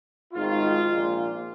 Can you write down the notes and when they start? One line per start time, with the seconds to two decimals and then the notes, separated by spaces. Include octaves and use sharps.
0.34 G#1 G#2 D#3 F4
0.87 A#1 A#2